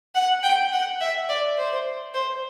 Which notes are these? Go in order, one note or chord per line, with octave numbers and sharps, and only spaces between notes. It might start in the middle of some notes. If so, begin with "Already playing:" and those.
F#5
G5
F#5
E5
D5
C5
C5